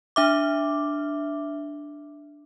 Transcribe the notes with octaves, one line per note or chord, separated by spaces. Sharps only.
D4 E5 D6